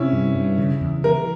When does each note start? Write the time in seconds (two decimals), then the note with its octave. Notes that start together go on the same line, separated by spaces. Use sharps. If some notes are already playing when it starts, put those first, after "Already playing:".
Already playing: C3 C#4 E4
0.12 G2
0.35 G2
0.58 C#3
0.81 E2
1.03 E3 A#4